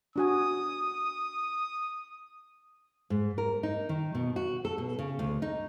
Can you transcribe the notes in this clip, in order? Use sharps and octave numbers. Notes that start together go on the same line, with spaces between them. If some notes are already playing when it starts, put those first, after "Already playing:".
D4 F#4 G#5 D#6
G#2
A#4
D#4
D#3
B2
F#4
A4
B2
C#3
D2
D#4